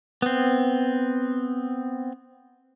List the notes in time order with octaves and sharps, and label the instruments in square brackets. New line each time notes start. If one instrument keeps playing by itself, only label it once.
[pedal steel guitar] B3 C4